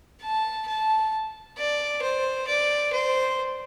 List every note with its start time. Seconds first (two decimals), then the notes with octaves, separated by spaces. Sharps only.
0.21 A5
0.67 A5
1.57 D5
2.02 C5
2.47 D5
2.93 C5